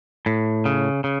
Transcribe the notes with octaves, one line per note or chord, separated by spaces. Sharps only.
A2
C#3
C#3